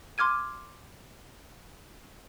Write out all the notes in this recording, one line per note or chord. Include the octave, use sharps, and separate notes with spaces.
C6 D6 F6 G#6 D#7